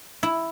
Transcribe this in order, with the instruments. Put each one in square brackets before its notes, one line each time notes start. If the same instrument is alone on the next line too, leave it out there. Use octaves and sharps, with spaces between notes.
[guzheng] E4